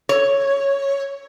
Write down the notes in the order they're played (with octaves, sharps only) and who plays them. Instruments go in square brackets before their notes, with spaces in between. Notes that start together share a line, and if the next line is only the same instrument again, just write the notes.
[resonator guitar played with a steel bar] C#5